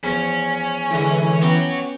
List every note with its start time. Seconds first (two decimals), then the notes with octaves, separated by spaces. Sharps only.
0.04 E2 F3 C#4
0.90 D3 E3 G#3
1.42 B3 C#4 F#4 G4 C#5